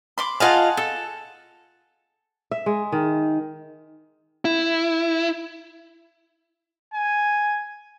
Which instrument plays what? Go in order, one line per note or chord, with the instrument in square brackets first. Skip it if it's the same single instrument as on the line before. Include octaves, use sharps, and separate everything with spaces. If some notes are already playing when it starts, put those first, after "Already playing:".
[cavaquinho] B5 C6 D6
[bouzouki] F4 D#5 F5 [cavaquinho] G#4 F#5 A5
[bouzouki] A4
[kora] E5
G#3
D#3
[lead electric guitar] E4
[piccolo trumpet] G#5